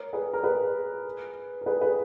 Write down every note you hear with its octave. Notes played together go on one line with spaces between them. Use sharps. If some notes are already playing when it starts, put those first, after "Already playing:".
Already playing: A#4 C#5
G#4 B4
A#4
G#4 B4
A#4
G#4 B4
G#4 B4